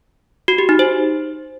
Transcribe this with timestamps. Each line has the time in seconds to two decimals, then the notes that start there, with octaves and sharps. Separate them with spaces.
0.48 F#4
0.58 G4
0.69 D#4
0.79 C5